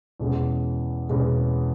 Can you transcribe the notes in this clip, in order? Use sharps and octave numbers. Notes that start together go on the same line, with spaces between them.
E2 B2 G#3 C#4
E2 B2 G#3 C#4